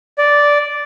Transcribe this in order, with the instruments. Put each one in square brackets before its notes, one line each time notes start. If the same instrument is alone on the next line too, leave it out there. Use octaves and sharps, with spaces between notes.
[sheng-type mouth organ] D5